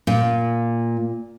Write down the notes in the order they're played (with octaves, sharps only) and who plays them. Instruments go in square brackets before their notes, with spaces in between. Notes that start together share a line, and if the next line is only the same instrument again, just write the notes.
[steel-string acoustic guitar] A#2